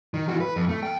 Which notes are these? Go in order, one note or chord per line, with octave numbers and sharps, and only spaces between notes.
D#3
E3 F#4
B4
F2
A3
F5 G5